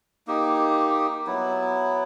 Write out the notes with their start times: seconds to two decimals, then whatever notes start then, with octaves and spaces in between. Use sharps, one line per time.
0.27 A#3 D#4 G4
1.27 F#3 B3 E4